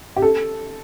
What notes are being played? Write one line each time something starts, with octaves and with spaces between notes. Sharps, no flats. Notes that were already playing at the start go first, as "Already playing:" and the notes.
G4
A4